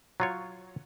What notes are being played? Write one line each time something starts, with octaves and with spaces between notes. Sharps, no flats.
F#3 F4 C#5